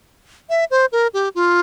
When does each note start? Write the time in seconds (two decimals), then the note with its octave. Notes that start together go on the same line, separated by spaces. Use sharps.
0.49 E5
0.71 C5
0.92 A#4
1.14 G4
1.35 F4